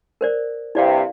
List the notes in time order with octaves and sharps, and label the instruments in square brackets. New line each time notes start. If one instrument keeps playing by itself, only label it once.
[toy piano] A#4 C5 D5
[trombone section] G2 C3 [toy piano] E4 D5 F5